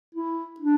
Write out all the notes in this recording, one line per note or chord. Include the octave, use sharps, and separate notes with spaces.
E4
D4